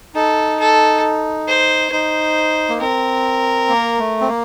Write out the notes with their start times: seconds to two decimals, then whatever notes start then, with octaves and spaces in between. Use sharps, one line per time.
0.15 D#4 A4
0.60 A4
1.48 C5
1.92 D#4 C5
2.69 A#3
2.80 C4 A#4
3.68 A#3
3.99 A3
4.21 C4
4.28 A#3